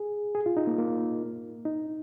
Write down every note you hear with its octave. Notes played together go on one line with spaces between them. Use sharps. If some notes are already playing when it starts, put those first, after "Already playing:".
Already playing: G#4
G#4
F4
D#4
A#3
A#3
D#4